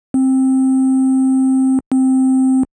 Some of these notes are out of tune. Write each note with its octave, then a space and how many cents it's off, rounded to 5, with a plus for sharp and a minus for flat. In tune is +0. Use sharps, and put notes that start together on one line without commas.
C4 +10
C4 +0